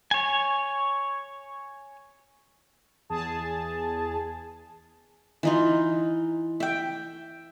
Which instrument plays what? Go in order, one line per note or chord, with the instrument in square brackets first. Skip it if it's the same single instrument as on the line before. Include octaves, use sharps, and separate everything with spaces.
[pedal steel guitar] C#5 G#5
[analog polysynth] E2 G#4 A5
[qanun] E3 D#4 F4
E5 G5